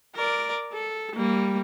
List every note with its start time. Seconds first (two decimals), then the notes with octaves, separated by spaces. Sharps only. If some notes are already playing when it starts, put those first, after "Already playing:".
0.16 A#4 D5
0.73 A4
1.16 G3 A#3